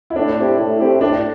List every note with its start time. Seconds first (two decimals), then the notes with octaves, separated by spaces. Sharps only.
0.10 E4
0.16 A2 D4
0.38 A3 C4 E4 G4
0.58 A2
0.79 A3 C4 E4 G4
1.01 A2 D4